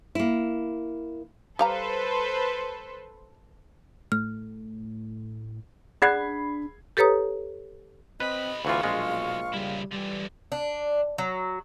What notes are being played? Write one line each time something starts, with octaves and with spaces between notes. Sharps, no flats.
A#3 E4
G3 A4 B4 C5 F5 A#5
A2 F6
D4 G#4 F#5 B5 F#6 G#6 C7
G4 A4 B4 C#5 A#5 D#6
B1 C4 B4 D#5 B5
D2 E3 F4 F5 C#6
A#1 G#3 F4
C#3 G3 E4
D3 E3 G3
D4
F#3